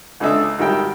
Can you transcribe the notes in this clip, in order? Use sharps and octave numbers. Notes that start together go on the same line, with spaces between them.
C#2 C#3 D4 A4 D#5 E5
G#1 D#3 F#3 G3 E5 G5